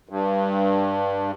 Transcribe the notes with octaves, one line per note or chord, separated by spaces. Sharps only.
G2